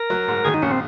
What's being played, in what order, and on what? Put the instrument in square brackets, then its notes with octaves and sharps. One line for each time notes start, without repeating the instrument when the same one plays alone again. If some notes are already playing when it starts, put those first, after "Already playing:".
Already playing: [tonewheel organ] A#4
[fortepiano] F#3
G#2
[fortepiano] D#3 [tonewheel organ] G#4
[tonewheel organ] D#4
[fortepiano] A#1 [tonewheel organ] C#4
[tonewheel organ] C4